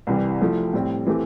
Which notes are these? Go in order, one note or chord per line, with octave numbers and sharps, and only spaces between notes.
C2 C3 E3 G3
F3 A3 E4
A2 G3 C4
E3 A3 C4 G4